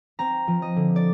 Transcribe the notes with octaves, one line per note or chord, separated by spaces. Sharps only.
C4 A#5
F3
D#5
D3
D5